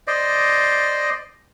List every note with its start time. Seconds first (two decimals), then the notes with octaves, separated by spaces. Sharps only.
0.07 C5 D5 D#5